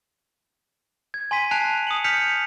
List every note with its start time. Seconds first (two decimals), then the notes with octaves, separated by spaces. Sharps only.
1.14 G#6
1.31 G#5 C6 G#6 B6 D#7
1.51 G#5 A5 F#6 C7 D7 F7
1.87 D#6 C#7 F#7
2.04 F6 G6 B6 C#7 F7